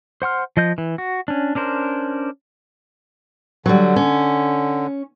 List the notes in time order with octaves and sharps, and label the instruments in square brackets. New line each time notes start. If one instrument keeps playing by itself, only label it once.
[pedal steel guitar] C5 F#5 C6 F6
F3 D#5 G6
E3
F#4
C#4 D4
C#4 D4 A#4 C5
[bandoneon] D3 [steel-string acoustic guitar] F#3 G3
[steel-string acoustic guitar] C#4